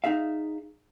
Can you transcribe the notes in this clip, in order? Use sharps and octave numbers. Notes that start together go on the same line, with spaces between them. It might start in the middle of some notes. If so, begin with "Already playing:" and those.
D#4 G#4 E5 F5